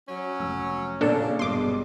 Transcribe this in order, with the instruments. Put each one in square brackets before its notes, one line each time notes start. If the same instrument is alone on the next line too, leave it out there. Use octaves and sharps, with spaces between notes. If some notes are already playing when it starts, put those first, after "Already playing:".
[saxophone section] F#3 C#4
[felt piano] F1 E6
[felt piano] A#2 [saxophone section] C#3 [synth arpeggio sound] D4 A4 A#4
[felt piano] G1 B2 [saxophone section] G2 G#3 [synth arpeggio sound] C6 D6